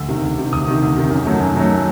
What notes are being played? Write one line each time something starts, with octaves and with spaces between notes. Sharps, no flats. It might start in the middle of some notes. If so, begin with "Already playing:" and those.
Already playing: D2 E6
C3 D#3
D2
C3 D#3
D2 D#6
C3 D#3
D2
C3 D#3
F#2
D#3 F#3 A3
F#2
D#3 F#3 A3